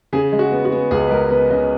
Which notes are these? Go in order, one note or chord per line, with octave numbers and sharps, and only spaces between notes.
C#3 G#4
G#3
F#4
B3
F#4
B3
C#2 G#4
B4
G#3 A#4
B3 B4
C#3 D#5